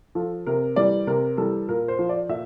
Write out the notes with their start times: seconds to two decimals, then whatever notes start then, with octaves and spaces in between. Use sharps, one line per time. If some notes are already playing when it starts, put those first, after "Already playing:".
0.15 F3 A4
0.46 C3 A#4
0.76 E3 G3 D5
1.07 C3 A#4
1.37 E3 G3 A4
1.69 A#2 A#4
1.88 C5
1.99 F3
2.09 D5
2.29 A#2 E5